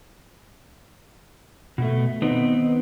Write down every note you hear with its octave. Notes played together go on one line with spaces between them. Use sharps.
B2 A3
D#3 B3 C4 D#4 B4